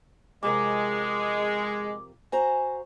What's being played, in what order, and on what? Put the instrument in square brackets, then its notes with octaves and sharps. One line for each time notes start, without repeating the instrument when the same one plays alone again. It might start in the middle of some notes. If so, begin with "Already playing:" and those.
[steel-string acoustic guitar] F2 C3 A#4 [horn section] G#3 [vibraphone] D6
[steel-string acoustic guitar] F#4 C5 A#5 [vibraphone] G#5